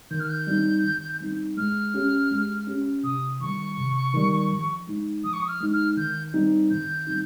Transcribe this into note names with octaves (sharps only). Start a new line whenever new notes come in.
D#3 G6
F6
G6
G3 C4 D#4
D#3
G3 C4 D#4
G#3 F6
C#4 G4
G#3
C#4 G4
C3 D#6
D#3 G3 C#6
C3
D#3 G3
F3
G#3 D#4
F3 D#6
C#6
D#6
F6
G#3 D#4
F6
D#3 G6
G3 C4 D#4
D#3 G6
G3 C4 D#4